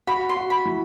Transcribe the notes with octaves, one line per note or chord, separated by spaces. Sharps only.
F#4 B5
C6
F#4
B5
E3